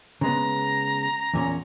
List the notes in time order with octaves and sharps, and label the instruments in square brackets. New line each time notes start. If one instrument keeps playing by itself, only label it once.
[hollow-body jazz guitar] C#3 G#3 B3 [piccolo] A#5
[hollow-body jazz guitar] E2 A#2 C#4